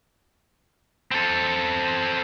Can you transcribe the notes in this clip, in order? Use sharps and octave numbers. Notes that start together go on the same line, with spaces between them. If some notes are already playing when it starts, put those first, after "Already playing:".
C4 A4